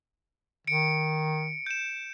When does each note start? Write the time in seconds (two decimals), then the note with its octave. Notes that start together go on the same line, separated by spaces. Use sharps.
0.67 D#3 C#7 D7
1.66 G6 E7